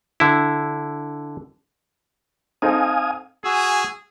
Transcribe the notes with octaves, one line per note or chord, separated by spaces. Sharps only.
D3 E4
C4 D#4 A4 F5 G#5 D#6
F#4 G#4 G#5 E6